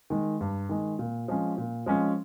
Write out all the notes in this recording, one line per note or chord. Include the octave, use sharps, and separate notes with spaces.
D#3 G#3
G2
D#3 G#3
A#2
F3 G#3 C#4
A#2
F3 G#3 C#4